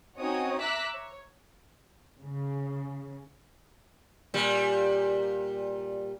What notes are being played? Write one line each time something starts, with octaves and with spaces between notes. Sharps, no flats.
C4 C#4 D#4 F#4 C#5 D#6
E5 A#5 D6 E6 F#6 B6
C#5
C#3
A#2 G3